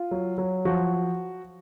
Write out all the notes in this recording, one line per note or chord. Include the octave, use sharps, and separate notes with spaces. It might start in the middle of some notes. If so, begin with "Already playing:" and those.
Already playing: F4
F#3
F#3
F3 F#4